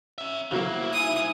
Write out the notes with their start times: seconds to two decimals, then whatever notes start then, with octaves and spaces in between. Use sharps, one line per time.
0.18 C#4 E5
0.51 C2 C#3 F#3 A#3 E4 F#4 C5 F#5
0.92 D#4 E5 G#5 D#6